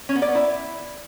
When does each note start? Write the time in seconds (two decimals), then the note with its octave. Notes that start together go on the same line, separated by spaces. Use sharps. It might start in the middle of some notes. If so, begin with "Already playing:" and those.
0.09 C#4
0.15 B3
0.22 D5
0.28 B3
0.35 E4